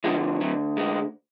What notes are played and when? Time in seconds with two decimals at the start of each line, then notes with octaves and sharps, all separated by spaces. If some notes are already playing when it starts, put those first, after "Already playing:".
0.04 D2 D3 F3 G#3
0.41 F#3
0.77 G#3